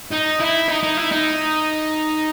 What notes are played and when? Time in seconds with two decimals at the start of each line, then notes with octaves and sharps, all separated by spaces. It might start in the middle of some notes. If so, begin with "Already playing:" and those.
0.11 D#4
0.40 E4
0.68 D#4
0.83 D#4
0.97 E4
1.12 D#4